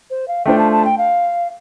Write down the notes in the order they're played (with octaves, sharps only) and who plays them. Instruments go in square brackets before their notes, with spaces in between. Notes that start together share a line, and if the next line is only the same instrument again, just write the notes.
[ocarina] C5
F5
[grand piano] A3 D4 F4 C5 [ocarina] G5
[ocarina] A5
A5
G5
F5